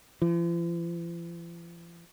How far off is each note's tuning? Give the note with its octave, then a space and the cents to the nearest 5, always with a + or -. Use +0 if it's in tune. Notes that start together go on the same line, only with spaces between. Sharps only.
F3 -45